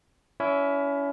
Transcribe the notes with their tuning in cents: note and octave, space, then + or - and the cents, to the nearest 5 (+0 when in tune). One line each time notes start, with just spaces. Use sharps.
C#4 +30 E4 +10